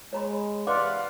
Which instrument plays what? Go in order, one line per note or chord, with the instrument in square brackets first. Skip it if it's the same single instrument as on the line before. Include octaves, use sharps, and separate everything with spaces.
[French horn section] G#3 [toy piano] C#5 A#5 B5
[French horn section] C3 E3 [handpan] B4 D5 F#5 [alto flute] F5 [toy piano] C6 D6